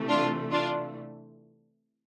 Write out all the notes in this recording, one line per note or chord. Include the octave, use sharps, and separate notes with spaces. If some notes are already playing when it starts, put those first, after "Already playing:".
Already playing: C3 E3 A3
D4 F4
D4 F4